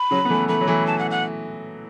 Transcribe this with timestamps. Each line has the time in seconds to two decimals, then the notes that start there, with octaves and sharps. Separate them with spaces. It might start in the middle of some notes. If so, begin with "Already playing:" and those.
Already playing: B5
0.11 C#3 F#3
0.25 B3
0.30 E3 A3
0.48 E3 A3 B5
0.61 F#3
0.67 E3 A3
0.87 A5
0.99 F#5
1.11 F#5